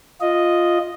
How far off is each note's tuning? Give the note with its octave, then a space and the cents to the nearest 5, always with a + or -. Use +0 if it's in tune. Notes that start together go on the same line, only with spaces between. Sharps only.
F4 +0 D#5 +0